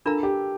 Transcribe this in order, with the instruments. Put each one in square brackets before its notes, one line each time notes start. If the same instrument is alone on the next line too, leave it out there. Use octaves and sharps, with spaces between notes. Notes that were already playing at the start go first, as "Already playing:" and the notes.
[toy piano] D4 F4 A#4 F5 A#5 [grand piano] A4
[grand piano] G4